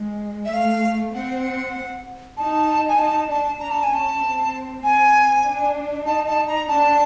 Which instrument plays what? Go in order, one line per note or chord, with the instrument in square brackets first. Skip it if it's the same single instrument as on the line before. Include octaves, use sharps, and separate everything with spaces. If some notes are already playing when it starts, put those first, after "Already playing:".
Already playing: [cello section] G#3
[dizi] E5
[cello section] A3 [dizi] F5
[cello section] C4 [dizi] F#5
[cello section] D#4 [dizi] A5
[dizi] G#5
[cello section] D#4 [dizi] A5
[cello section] D4 [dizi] A5
[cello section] D4 [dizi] A#5
[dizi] A5
G#5
[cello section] C#4 [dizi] A5
[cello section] C4
[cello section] C4 [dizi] G#5
[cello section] D4
[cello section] D#4 [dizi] A5
[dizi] A5
A#5
[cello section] D4 [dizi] A5